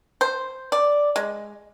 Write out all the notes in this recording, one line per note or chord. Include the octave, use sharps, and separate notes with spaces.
C5
D5
G#3